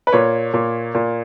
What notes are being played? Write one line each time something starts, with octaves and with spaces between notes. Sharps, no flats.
B4
A#2 C#5
A#2
A#2